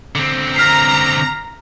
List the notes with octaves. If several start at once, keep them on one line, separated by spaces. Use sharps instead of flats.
D3 C4
A#5 F6 B6 C7